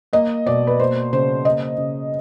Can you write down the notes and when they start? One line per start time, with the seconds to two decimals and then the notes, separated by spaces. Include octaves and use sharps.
0.13 A#3 D#5
0.46 B2 D5
0.67 B4
0.80 A#3 C5
1.13 C#3 C5
1.45 A#3 D#5
1.78 C#3